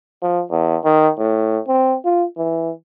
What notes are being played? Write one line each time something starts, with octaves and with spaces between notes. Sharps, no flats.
F3
E2
D#3
A2
C4
F4
E3